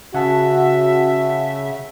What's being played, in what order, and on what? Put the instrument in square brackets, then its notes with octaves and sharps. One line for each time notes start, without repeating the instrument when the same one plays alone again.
[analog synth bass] C#3 [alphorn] F#4 [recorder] E5 [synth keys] F#5 A5